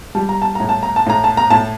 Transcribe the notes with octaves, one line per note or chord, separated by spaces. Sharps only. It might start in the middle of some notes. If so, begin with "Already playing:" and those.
G3 A5
A#5
A5
A2 A#5
A5
A#5
A5
A2 A#5
A5
A#5
A2 A5